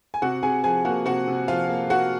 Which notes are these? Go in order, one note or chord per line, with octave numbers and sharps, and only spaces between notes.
G#5
C3 F#4 F#5
C3 G#4 G#5
F3 G#4 G#5
A#3 F#4 F#5
C3 F#4 F#5
C3
F3 F4 F5
A#3
A#3 F#4 F#5